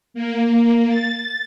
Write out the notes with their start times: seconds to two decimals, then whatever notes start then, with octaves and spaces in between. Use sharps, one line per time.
0.14 A#3
0.88 A6